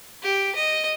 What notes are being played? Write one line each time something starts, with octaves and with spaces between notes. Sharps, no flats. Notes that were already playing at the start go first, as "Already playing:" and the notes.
G4
D#5